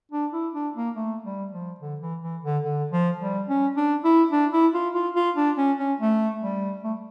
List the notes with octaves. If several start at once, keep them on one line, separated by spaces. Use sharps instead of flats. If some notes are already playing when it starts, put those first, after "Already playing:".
D4
E4
D4
A#3
A3
G3
F3
D3
E3
E3
D3
D3
F3
G3
C#4
D4
E4
D4
E4
F4
F4
F4
D4
C#4
C#4
A3
G3
A3